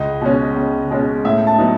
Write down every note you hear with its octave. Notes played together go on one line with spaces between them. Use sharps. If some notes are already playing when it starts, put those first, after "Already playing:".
Already playing: C#2 D#5
B2 G#3 C#4
C#2
B2 G#3 C#4
A2 E5
A5
F#3 B3 D#4